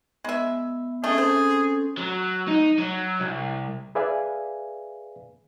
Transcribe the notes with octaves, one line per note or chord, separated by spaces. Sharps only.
G#3 B3 E5
A3 C4 C#4 G#4 A4
C5
F#3
D#4
F#3
C2
G#4 B4 D5 E5 F5 G#5